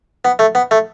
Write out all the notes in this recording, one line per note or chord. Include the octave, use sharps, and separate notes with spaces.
B3
A3
B3
A3